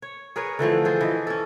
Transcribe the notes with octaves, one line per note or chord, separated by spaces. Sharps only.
C#5
G#4 A#4 B4 C#5
D3 E3 F3 A3
G#4 A4 C5
E3 D#5
C#4 A4